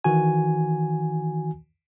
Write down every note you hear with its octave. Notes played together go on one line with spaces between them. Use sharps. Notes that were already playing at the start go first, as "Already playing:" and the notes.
D#3 E3 F#4 G#5